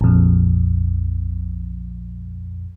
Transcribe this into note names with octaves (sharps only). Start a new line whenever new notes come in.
A#1 F2